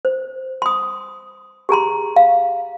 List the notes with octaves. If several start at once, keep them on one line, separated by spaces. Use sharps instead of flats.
C5
C6 D#6
G4 G#4 A#5 C6
F5